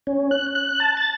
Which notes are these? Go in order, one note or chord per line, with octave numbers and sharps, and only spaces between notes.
C#4
F#6
F#6
A5
A6